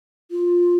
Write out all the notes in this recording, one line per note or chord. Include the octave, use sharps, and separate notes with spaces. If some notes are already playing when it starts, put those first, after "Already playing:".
F4